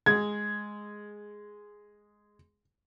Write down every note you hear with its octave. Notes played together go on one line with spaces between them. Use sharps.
G#3 G#4 G#6